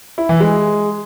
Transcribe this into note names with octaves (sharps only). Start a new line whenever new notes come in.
E4
E3
G#3